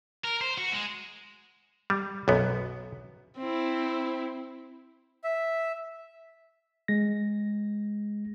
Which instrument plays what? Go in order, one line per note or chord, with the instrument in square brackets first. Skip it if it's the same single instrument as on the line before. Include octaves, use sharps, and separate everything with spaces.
[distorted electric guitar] A#4
C5
F#4
G#3
[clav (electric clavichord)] G3
B1 F#2 B3
[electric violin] C4 E4
[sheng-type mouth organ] E5
[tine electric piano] G#3 A#6